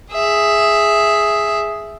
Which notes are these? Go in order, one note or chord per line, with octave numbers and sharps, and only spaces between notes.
G#4 E5